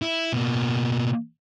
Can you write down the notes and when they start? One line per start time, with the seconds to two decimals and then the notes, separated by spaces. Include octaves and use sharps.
0.02 E4
0.33 B2 A#3